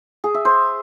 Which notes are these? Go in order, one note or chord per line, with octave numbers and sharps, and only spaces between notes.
G#4
E5
C5